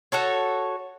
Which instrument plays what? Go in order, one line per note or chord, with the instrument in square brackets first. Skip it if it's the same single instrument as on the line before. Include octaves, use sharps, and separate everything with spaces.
[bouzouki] F#4 A4 C#5